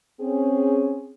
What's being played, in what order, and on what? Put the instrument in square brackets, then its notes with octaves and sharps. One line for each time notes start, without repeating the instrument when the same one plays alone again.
[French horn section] C4 C#4 G#4